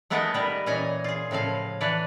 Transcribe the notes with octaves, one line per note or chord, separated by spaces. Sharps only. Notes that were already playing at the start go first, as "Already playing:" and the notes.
G#3 A3 B3 D#4 A#4 D#5
G3 A#4 B4
A#2 E3 C#4 D#5 G#5 A#5
F4 G#4
A2 C#3 F3 F5
E3 D4 B4 C#5 D5